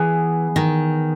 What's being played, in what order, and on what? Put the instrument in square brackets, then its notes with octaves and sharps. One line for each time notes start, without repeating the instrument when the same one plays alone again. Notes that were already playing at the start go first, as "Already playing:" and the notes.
Already playing: [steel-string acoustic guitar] E3 [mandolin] B3 G#4
[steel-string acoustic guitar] D#3